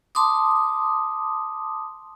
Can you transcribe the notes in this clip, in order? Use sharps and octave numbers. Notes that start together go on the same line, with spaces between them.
A5 C6 D6 D#6